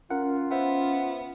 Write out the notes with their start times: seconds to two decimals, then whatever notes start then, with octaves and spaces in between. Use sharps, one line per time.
0.10 C#4 F4 A#4 F#5
0.51 B3 C5 E5 F#5